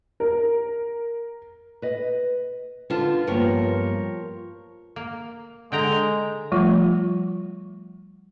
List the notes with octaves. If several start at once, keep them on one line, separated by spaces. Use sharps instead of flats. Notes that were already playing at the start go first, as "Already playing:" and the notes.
A#4
B4 D#5
D3 B3 F4 A5
G2 F3 A#3 B3 A#4 C#5
A#3
D3 G#3 G5 A#5
F3 G3 A3 F4